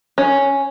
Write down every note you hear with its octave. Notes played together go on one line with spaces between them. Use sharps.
C#4